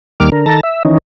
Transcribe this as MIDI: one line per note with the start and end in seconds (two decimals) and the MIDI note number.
0.20 0.30 39
0.20 0.30 51
0.20 0.30 55
0.20 0.30 58
0.20 0.30 86
0.20 0.30 89
0.32 0.46 50
0.32 0.46 70
0.46 0.60 51
0.46 0.60 69
0.46 0.60 81
0.46 0.60 82
0.63 0.83 76
0.85 0.98 51
0.85 0.98 52
0.85 0.98 61
0.85 0.98 63